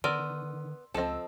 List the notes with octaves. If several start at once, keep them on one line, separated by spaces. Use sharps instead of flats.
D3 D#3 B3 A#4 D5 C6 E6 D#7
C#2 F3 C4 A4 D#5 A5 E6